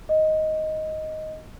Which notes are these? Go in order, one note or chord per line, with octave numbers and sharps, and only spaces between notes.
D#5